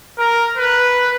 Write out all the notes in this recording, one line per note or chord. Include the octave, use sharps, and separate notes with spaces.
A#4
B4